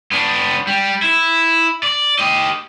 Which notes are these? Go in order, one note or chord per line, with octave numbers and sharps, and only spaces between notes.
B3 D4
G3
E4
D5
G4 D#5